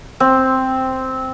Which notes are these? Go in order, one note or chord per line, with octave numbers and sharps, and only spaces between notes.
C4